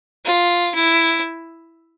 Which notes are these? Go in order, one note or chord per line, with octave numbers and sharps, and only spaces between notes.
F4
E4